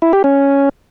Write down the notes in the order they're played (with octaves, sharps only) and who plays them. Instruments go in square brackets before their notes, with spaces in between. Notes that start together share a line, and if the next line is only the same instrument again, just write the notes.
[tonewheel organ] E4
G4
C#4